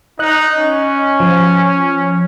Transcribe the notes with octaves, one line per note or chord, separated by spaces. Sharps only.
D#4 D#5 F#6
C#4
F3